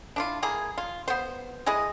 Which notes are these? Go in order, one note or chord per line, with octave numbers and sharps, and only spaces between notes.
D4 E4 F4
A#3 E4 G#4
F4
B3 C5
G#3 E4 G#4 D#5